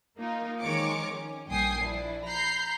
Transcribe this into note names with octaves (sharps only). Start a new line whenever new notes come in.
A#3 D#4 F4 A#4
D#3 F3 G#3 C#5 D6 C#7
C#4
A#1 G2 G5 G#5 D#6 C7
F3 D4 E4
A#5 B5 G6 C7